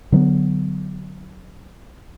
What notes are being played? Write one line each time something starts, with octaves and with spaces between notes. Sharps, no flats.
D3 F#3 A3 B3